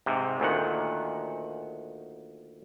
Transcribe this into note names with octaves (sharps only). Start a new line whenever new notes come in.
G#2 C3
D2 A#2 D#3 F#5